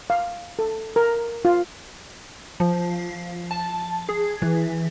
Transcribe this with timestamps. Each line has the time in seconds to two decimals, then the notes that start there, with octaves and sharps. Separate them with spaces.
0.10 F5
0.59 A4
0.96 A#4
1.45 F4
2.60 F3
3.51 A5
4.09 G#4
4.42 E3